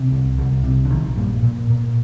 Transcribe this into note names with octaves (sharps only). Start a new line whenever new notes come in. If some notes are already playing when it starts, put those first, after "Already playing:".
Already playing: C3
C2
C2
C3
D3
A#1 D#3
G2 A#2 G3
A#2
A#2